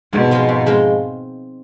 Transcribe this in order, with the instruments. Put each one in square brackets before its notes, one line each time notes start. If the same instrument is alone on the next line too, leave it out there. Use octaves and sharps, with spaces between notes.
[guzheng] G#2 [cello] B2
[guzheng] F3 G#3 C4 F4
G#2
F3 G#3 C4 F4